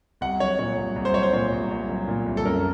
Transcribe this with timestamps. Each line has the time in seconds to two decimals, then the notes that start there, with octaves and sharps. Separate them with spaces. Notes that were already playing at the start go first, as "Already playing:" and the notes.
0.21 C2 F#5
0.40 F#3 C#5
0.59 A#2 C#5
0.77 C2
0.96 C2
1.05 C5
1.14 F#3 C#5
1.23 C5
1.33 A#2 C#5
1.52 C2
1.71 C2
1.89 F#3
2.08 A#2
2.26 C2
2.37 A4
2.45 F#2 A#4